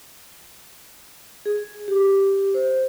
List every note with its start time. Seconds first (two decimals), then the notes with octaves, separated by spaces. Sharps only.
1.46 G#4
1.88 G4
2.54 C5